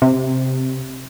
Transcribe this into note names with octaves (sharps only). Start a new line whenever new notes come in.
C3